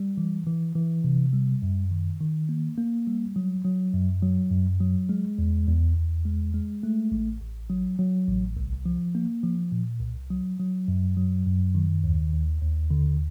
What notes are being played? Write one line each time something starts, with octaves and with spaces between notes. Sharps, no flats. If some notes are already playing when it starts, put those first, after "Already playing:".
Already playing: G3
E3
E3
E3
C3
G3
F#2
D#3
D#3
A#3
A#3
G3
F#3
F#3
F#2
F#3
F#2
F#3
G#3
E2
E2
E2
G#3
G#3
A3
A1
A1
F#3
F#3
A1
C2
F3
A#3
F3
A#2
C2
F#3
F#3
F#2
F#3
F#2
D#3
D#2
D#2
D#2
D3